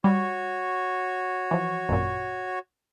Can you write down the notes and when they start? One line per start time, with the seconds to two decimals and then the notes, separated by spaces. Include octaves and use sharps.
0.04 G3 F#4 C#5
1.51 E3 F3
1.89 G#1 F#2 A#2